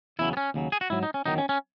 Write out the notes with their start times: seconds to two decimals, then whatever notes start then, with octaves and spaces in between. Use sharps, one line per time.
0.19 E2 C#3 F#3 E4
0.33 B3
0.37 C#4
0.54 D#2 C#3 F#3
0.72 G#4
0.81 F#4
0.90 G#2 F#3 E4
1.03 D#4
1.14 C#4
1.26 E2 D#3 F#3 D#4
1.38 C#4
1.49 C#4